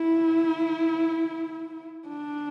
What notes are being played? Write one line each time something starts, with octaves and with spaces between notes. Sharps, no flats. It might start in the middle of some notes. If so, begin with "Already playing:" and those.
Already playing: E4
D4